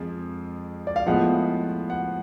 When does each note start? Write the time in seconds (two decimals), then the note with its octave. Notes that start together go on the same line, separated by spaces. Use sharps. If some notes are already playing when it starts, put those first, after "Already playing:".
Already playing: F2 F3 G#3
0.87 D5
0.96 F5
1.06 A2 F3 G#3 B3 F#5
1.90 F#5